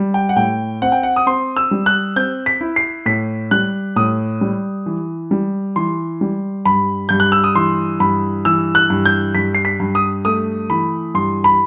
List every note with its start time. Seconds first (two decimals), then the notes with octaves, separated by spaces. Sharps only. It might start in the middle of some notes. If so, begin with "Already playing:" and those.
Already playing: G3
0.14 G5
0.29 F#5
0.36 A2 G5
0.82 C4 F#5
0.92 G5
1.03 F#5
1.16 D#6
1.26 C4 C6
1.57 E6
1.71 G3
1.86 F#6
2.16 C4 G6
2.46 B6
2.61 E4
2.76 C7
3.06 A2 B6
3.51 G3 F#6
3.96 A2 D#6
4.41 G3
4.86 E3
5.31 G3
5.76 E3 C6
6.21 G3
6.65 G2 B5
7.09 G2 G6
7.20 F#6
7.32 E6
7.44 D#6
7.55 E3 C6
8.00 G2 B5
8.45 E3 E6
8.75 F#6
8.90 G2
9.06 G6
9.35 G2 B6
9.55 C7
9.65 B6
9.80 G2
9.95 D#6
10.25 A3 D#6
10.70 E3 B5
11.15 G2 C6
11.44 B5